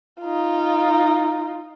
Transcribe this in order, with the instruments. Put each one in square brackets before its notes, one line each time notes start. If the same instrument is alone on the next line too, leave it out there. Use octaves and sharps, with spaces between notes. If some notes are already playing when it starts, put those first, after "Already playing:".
[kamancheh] D#4 F4